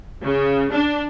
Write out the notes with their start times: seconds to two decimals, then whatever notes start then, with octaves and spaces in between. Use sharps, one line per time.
0.23 C#3
0.71 D4